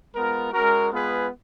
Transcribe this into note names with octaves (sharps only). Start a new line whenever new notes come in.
G#3 B3 F4 A#4
G#3 C#4 F#4 A#4
G#3 B3 F4 G#4 B4